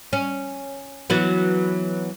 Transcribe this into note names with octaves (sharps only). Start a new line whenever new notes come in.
C#4
E3 F#3 B3